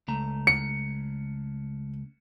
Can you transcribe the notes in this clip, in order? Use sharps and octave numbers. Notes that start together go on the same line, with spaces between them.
C#2 A3 A#5
C#7